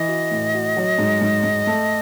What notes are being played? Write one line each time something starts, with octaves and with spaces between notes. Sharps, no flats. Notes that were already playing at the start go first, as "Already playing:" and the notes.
Already playing: E3 D#5
F#4
A2
F#4
F#3
G#2
G#2
G#2
A3